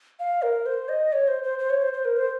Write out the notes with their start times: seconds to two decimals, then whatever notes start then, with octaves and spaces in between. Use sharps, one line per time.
0.20 F5
0.42 A#4
0.66 C5
0.89 D#5
1.13 C#5
1.28 C5
1.43 C5
1.59 C5
1.70 C#5
1.82 C5
1.93 C5
2.05 A#4
2.17 C5